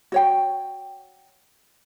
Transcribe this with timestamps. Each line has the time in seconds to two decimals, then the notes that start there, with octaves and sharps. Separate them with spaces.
0.12 F#4 C#5 G5